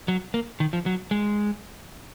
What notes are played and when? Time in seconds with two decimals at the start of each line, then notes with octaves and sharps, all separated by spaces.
0.08 F#3
0.34 A#3
0.60 D#3
0.73 F3
0.86 F#3
1.11 G#3